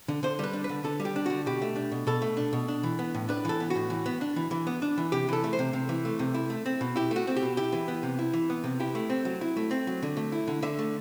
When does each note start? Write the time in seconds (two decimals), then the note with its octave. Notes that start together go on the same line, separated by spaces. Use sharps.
0.08 D3
0.23 D3 C5
0.39 G3 B4
0.53 D4
0.64 D3 B4
0.84 D3 A4
1.00 G3
1.05 G4
1.16 D4
1.26 D3 F#4
1.46 B2 G4
1.62 A3
1.76 D4
1.92 B2
2.07 B2 A4
2.22 A3
2.37 D4
2.53 B2
2.68 D4
2.83 E3
2.99 B3
3.14 A2
3.29 D4 B4
3.45 E3 A4
3.60 B3
3.70 F#4
3.76 A2
3.90 E3
4.06 B3
4.21 D4
4.36 E3
4.51 E3
4.67 B3
4.82 D4
4.98 E3
5.12 C3 G4
5.29 E3 A4
5.44 A3
5.53 C5
5.59 C3
5.73 C3
5.89 E3
6.05 A3
6.19 C3
6.34 E4
6.50 A3
6.66 C4
6.81 B2
6.96 E4 G4
7.11 A3 F#4
7.27 C4
7.36 G4
7.43 B2
7.57 E4 G4
7.72 E3
7.88 B3
8.03 C3
8.19 E4
8.33 E3
8.50 B3
8.64 C3
8.80 E4 G4
8.95 A3
9.10 C4
9.25 F#3
9.41 E4
9.57 A3
9.71 C4
9.87 F#3
10.03 D3
10.17 A3
10.32 E4
10.48 D3
10.62 D3 E5
10.79 A3